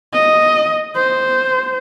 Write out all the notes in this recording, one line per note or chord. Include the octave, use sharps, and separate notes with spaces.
D#5
C5